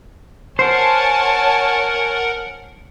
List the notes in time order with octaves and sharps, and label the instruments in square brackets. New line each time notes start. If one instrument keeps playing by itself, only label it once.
[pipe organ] A#4 F#5 [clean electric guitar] C5 [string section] C#5 G#5 A5